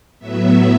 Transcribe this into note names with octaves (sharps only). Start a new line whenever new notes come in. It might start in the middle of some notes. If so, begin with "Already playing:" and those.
A2 F#3 B3 E5